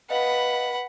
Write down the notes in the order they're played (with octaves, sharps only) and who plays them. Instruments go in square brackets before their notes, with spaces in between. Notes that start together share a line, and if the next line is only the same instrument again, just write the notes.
[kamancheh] B4 [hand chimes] D#5 F5 [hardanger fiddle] F#5 B5